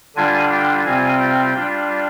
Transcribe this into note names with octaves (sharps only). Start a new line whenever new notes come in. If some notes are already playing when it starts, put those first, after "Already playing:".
D3 G3 D4 F4 G#5
G5
C3 G3 C4 F4 G#5
G5
G3 D4 F4